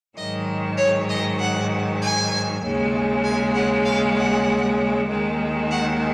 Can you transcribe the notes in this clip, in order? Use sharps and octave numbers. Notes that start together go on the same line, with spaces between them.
G#2 D#3 F#3 D#5
C#5
D#5
F#5
G#5
D#2 C#3 G#3
G#5
F#5
F5
F#5
D#2 D#3 G#3
F#5